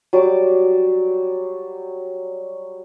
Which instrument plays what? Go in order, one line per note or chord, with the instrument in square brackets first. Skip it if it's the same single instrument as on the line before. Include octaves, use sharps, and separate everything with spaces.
[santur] F#3 G3 D5 D6